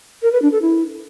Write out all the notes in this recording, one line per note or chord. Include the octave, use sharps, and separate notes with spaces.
A#4
B4
D4
A4
E4